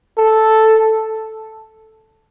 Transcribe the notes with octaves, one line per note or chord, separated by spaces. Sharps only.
A4